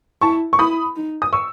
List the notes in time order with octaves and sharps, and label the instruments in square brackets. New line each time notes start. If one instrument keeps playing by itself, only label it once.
[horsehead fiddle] E4 [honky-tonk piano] A5 C#6
[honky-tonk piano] C#6
[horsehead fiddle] E4 [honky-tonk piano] B5 D#6
[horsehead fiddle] D#4
[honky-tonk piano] D#6
C#6 E6